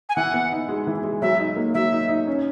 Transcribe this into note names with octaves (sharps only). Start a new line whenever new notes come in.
G#5
E3 F#5
B3
D#4
G#3
E3
G#3
F#3 E5
D#4
A#3
F#3 E5
D#4
D#4
C#4